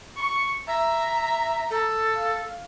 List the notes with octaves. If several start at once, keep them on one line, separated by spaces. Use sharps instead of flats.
C#6
E5 A#5
A4
F5